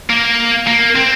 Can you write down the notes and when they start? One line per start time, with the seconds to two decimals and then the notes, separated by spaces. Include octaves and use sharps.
0.10 A#3
0.67 A#3
0.96 C4